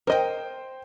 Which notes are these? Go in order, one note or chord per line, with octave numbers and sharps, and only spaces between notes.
A#4 C5 D#5 G5